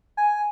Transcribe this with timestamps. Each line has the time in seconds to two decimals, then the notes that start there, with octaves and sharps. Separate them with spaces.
0.17 G#5